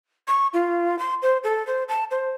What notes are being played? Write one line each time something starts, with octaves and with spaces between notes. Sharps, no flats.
C#6
F4
C6
C5
A4
C5
A5
C5